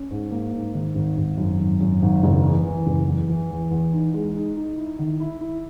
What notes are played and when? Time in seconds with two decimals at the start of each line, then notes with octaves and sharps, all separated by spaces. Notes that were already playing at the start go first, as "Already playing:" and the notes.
Already playing: C#4
0.11 G#2
0.31 A#3
0.53 G#2
0.74 D#3
0.95 G#1
1.17 G#1
1.38 F#2
1.59 G#1
1.80 F#2
2.02 G#1
2.23 F#1
2.44 E2
2.65 E3
2.86 F#1
3.07 E2
3.29 E3
3.51 E2
3.71 E2
3.93 D#4
4.14 G#3
4.35 D#4
4.57 D#4
4.77 E4
4.99 D#3
5.20 E4
5.41 E4